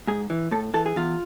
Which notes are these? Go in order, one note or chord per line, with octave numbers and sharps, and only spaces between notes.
G#2 G#4
E3
A2 A4
E3 A4
G#4
E2 F4